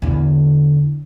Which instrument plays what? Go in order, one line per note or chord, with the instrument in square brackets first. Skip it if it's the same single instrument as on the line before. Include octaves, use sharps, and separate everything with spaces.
[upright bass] E2 D3